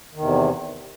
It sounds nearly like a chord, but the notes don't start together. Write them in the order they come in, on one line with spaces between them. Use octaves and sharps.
D#3 E2 C3